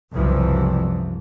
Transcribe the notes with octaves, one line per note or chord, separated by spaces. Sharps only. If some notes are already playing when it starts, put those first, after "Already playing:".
F#1 C2 F#2 E3 F3